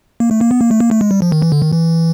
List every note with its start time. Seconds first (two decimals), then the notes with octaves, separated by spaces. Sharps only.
0.20 A#3
0.31 A3
0.41 A#3
0.51 B3
0.61 A#3
0.71 A3
0.80 A#3
0.91 A3
1.01 G#3
1.11 G3
1.22 F3
1.32 D#3
1.42 E3
1.52 D3
1.62 D#3
1.73 E3